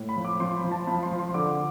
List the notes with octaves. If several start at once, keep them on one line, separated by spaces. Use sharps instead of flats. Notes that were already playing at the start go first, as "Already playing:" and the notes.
Already playing: A2
B5
F3
D6
F3 C6
B5
F3
A5
F3 B5
C6
F3
C6
D3 D6